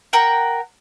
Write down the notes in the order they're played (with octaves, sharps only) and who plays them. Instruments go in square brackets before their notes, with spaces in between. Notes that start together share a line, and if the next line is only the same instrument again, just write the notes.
[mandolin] A#4 F#5 G5